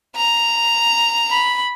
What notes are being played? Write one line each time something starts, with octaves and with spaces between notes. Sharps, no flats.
A#5
B5